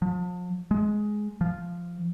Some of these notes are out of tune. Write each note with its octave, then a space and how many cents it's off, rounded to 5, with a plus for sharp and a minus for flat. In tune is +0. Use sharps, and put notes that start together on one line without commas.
F3 +40
G#3 +10
F3 -10